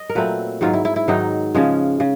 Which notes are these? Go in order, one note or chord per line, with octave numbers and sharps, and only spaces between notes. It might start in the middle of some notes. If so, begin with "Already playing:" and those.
Already playing: D#5
A#4
A#2 F#3 A3 C4 B4
G#2 D#3 F#3 F4
E4
E4
E4
G#2 D#3 F#3 D#4
C#3 F3 G#3 C#4
C#3